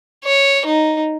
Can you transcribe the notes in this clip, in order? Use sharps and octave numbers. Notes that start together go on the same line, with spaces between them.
C#5
D#4